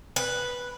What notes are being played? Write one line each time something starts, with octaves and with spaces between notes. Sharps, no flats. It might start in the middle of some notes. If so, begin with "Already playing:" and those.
B4